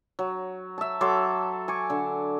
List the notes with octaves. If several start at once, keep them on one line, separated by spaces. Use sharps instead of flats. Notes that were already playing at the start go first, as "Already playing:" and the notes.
F#3
E5 A5
F#3 A4 C6 D6
G#5 C#6 D6
D3